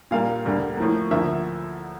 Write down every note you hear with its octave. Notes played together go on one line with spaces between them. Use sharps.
A#2 G3 A#3 F5
D2 D3 G3 A#3
A2 F3 A#3
D2 D3 F3 A#3 E5